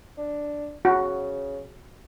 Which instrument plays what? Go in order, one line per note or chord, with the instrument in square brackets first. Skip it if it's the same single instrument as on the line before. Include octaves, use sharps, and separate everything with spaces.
[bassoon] D4
[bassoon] C#3 [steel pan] F#4